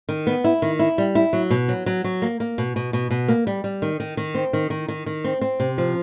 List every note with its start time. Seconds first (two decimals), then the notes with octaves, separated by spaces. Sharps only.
0.09 D#3
0.27 B3
0.44 E4
0.62 D#3
0.79 E4
0.98 G3
1.15 E4
1.33 F#3
1.50 B2
1.68 F#3
1.86 F#3
2.04 F#3
2.22 A#3
2.40 A#3
2.58 B2
2.76 B2
2.93 B2
3.11 B2
3.28 A#3
3.47 G3
3.64 G3
3.82 D#3
4.00 D#3
4.17 D#3
4.35 C4
4.53 D#3
4.70 D#3
4.88 D#3
5.06 D#3
5.24 C4
5.41 C4
5.60 C3
5.78 F3